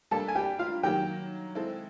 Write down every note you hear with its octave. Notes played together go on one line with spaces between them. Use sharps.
G3 A#3 D4 A4 A5
G#5
G4 G5
F4 F5
D#3 F#3 A#3 G4 G5
G#3 C4 E4 A4